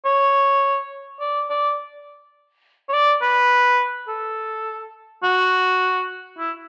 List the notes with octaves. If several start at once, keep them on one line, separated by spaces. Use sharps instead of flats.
C#5
D5
D5
C#5
D5
B4
A4
F#4
E4